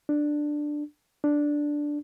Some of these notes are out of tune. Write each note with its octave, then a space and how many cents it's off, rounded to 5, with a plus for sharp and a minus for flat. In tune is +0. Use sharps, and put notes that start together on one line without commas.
D4 +10
D4 +0